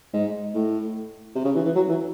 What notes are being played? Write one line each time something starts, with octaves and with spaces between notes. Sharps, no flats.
G#2
A2
C3
C#3
E3
E3
F#3
E3